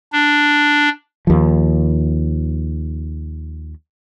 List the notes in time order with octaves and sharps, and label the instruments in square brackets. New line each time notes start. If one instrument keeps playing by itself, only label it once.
[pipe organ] D4
[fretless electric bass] D#2 F3